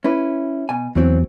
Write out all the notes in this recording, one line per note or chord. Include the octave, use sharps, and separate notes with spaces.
C#4 E4 B4
B2 G#5
E2 E3 F#3 C4